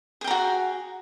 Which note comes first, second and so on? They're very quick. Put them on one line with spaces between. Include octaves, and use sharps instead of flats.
G#4 G5 A#5 F#4